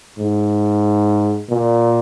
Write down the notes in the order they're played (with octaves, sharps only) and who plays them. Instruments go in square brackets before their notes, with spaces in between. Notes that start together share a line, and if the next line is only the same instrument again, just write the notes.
[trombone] G#2
A#2